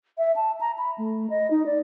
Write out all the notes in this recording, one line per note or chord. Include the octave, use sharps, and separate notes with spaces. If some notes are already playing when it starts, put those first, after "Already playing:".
E5
A5
A#5
B5
A3
D#5
D#4
D5